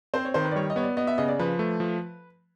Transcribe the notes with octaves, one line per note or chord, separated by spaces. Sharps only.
C4 C5
C#5
D#3 C5
B4
D5
G3 C#5
D#5
B3 C#5
D5
B3 D#5
E5
C#3 D#5
D5
F3 B4
A3
F3